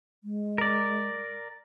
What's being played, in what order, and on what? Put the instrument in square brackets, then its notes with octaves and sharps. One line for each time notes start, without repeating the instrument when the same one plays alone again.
[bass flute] G#3
[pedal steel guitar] A#4 D5